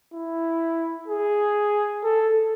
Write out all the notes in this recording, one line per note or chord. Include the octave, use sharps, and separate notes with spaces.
E4
G#4
A4